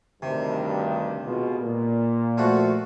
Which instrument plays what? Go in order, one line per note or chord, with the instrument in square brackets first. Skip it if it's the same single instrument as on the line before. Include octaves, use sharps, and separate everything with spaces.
[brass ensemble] D2 G2 D#3 [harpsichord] C3
[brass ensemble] B2 G#3 F4
A#2
[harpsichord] F3 A3 F#4